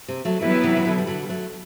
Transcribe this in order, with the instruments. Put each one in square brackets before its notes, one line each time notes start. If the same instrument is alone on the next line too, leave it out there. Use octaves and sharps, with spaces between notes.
[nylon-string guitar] C3
F#3 A3
[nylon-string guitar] E3 G3 [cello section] F#3 B3 E4 B4
[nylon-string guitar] C3 E3
E3
B2 D3
G3
D3 F#3
G3
F#3 A3